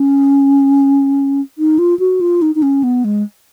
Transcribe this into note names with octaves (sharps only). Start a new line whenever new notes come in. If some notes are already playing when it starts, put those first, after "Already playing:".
Already playing: C#4
D#4
F4
F#4
F4
D#4
D#4
C#4
B3
G#3